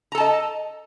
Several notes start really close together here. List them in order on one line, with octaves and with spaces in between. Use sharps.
A#5 A4 A5 D#5